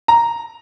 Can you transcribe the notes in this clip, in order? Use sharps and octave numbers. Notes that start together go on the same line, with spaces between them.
A#5